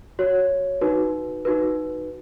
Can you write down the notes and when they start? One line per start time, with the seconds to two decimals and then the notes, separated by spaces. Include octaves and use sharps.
0.19 F#4 C#5
0.81 D#4 F#4 B4
1.45 D#4 F#4 B4